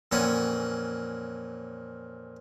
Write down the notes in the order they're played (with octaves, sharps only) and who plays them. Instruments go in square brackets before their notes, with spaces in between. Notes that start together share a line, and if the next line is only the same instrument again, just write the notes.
[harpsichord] F2 A#2 E3 C#4 C#5 F#5